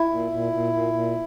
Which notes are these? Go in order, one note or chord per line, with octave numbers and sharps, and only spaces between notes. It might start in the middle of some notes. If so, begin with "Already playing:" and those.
Already playing: E4
A#2
A#2
A#2
A#2
A#2